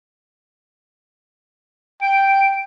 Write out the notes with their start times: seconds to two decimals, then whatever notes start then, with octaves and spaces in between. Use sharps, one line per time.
2.02 G5 D7